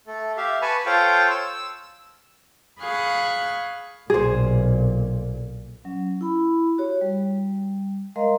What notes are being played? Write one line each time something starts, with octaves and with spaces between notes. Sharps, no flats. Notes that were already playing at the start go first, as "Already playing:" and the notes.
A3 A4
G4 E5 F5
B4 G#5 A5 B5 C#6
F4 A4 C5 C#5 F5 G5
E6
G#4 F5 B5 C#6 F#6
B1 A#2 G#4 C5
F#3 C#4
E4 B5
F#4 G4 C#5
G3
G#3 A#4 D#5 F5 A#5 C6